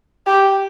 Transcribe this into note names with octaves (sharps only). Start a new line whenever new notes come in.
G4